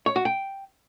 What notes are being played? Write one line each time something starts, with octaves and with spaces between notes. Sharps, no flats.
C#5
F#4
G5